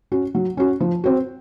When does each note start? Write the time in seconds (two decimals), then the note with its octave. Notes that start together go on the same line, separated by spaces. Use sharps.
0.12 C#4 F#4
0.35 F#3
0.57 C#4 F#4
0.80 F3
1.04 C4 F#4